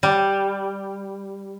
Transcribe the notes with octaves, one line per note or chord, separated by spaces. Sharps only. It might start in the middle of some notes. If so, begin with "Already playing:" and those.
G3